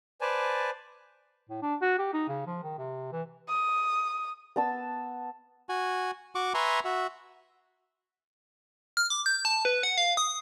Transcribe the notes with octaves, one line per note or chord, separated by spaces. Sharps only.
B4 C5 D5 G#5 A5
A2
D4
F#4
G4
D#4
C#3
F3
D#3
C3
E3
D#6
B3 A5 E6
F#4 G#5
F#4 C#6 D6
B4 E5 G#5 A#5 C6 C#6
F#4 E5
F6
D6
G6
A5
B4
F#5
F5
D#6